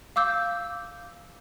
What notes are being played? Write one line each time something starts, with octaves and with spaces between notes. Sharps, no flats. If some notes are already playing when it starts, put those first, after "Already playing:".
F5 D6 E6 G6